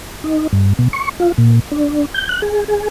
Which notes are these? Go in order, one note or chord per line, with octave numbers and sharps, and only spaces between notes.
D#4
G2
B2
C#6
F4
A#2
D4
G6
F#6
G#4
G#4